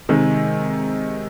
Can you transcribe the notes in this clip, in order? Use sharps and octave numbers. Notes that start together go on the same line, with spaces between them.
C3 D#3 G#3